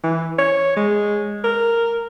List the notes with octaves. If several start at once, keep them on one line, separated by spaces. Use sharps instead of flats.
E3
C#5
G#3
A#4